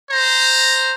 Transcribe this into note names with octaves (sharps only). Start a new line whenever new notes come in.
C5 A#5